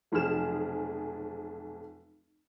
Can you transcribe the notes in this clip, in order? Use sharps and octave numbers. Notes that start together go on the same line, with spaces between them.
F1 B1 F3 G#4 F6 E7